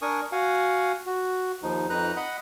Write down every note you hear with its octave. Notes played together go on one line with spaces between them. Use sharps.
D4 A#4 G#5 C#6 D#6
F#4 F5 F#5 G#5
F#4
D#2 F3 D#4
F2 D#4 B4 A#5 F#6
D#5 F#5 B5